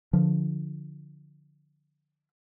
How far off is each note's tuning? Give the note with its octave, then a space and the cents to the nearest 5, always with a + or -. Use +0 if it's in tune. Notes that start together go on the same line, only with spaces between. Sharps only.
D3 +0 F3 +0